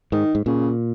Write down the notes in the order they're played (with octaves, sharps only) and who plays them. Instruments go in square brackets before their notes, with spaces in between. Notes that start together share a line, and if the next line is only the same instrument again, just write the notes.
[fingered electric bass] G#2 [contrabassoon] D#3
[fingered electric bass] G#2
[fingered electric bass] A#2 [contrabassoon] C#3